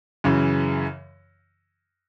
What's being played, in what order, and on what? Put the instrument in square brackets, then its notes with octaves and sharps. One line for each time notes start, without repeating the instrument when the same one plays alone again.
[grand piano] F#2 C#3 E3